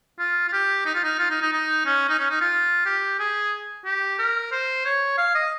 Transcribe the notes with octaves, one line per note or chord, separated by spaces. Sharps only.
F4
F4
G4
D#4
F4
D#4
F4
D#4
D#4
D#4
C#4
D#4
C#4
D#4
F4
G4
G#4
G4
A#4
C5
C#5
F5
D#5